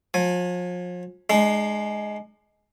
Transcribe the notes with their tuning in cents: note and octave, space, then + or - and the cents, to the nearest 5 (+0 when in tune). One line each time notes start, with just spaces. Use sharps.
F3 +40 G#5 +0
G#3 +10 D4 +45